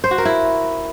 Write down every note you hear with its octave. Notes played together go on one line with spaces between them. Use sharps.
C5
F#4
A#4
E4